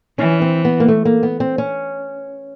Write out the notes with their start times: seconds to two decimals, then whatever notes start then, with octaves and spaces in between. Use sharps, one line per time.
0.18 E3 C#4
0.42 C4
0.65 B3
0.80 A#3
0.88 A3
1.05 A#3
1.23 B3
1.40 C4
1.58 C#4